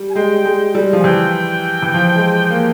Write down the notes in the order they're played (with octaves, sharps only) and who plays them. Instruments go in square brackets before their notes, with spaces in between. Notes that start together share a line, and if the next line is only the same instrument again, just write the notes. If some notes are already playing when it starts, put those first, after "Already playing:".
Already playing: [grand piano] G3
[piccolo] G#5
[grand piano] G#3 [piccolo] G5
[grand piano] G#3
G3
F3
[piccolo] G#5
[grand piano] E3 [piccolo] G5
[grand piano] E3
F3
G#3
A#3